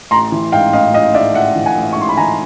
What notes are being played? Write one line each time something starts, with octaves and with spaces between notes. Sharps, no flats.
A1 A#5 C6
E3
G#2 F5 G5
A1 D#5 F5
G#2 D#5 F5
G#2 D5 E5
A1 E5 F#5
E3
F#5 G#5
A1
C#6
G#2 C6
B5
E3 G#5 A#5